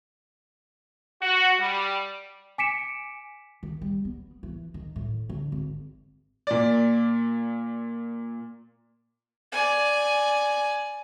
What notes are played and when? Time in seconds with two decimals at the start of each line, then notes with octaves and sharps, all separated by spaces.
1.22 F#4
1.59 G3
2.58 G#5 D6 B6 C#7 D7 E7
3.63 D#3
3.82 G3
4.05 B3
4.43 E3
4.74 D#3
4.96 A2
5.29 D3
5.52 G#1
6.47 A#2 D5
9.52 D5 G#5